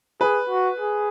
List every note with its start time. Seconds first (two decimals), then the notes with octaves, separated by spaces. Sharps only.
0.21 G#4 B4
0.50 F#4
0.80 G#4